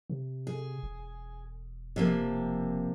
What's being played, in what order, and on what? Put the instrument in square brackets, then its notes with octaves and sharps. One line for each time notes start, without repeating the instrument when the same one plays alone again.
[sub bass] C3
[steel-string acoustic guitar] G#4
[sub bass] E1
[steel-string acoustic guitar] C3 F3 A#3